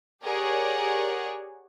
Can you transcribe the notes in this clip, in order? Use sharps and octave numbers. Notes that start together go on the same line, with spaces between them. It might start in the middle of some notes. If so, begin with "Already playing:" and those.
G4 G#4 A#4 C#5 D5 F#5